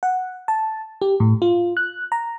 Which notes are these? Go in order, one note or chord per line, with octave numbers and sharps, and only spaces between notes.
F#5
A5
G4
A2
F4
F#6
A#5